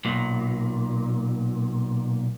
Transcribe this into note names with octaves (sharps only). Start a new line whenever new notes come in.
B1 A#2